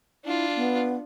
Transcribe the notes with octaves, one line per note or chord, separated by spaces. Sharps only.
D4 E4 F4
B3